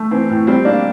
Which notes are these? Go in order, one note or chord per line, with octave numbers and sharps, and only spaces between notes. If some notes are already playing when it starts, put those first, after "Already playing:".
Already playing: A3
E3 C4
A2
G3 C4
A#3 D4